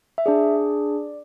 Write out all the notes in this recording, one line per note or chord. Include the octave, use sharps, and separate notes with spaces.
E5
D4 G#4 D5